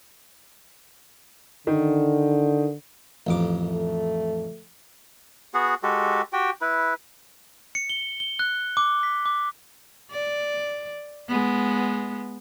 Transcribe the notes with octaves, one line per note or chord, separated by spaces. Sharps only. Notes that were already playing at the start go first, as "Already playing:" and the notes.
D3 D#3
A1 F2 D6
A3
B3 F#4 G#4 F#5
G#3 F#4 G4 A4
F#4 G4 G5
E4 B4
C#7
G7
G7
F#6
D6
B6
D6
D5
G#3 B3